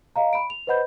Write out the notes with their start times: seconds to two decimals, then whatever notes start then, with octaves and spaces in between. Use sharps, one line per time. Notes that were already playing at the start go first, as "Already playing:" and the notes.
0.16 D#5 F5 A#5
0.33 B5 D7
0.50 F7
0.67 B4 C5 D#5 F#5 B5 G6